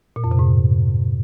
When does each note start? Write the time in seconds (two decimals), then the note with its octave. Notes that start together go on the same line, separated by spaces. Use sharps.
0.16 A#2
0.24 F2
0.31 C3
0.39 G#2